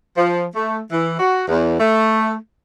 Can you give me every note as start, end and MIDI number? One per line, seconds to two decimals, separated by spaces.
0.17 0.46 53
0.56 0.79 57
0.92 1.16 52
1.19 1.43 66
1.48 1.79 40
1.80 2.35 57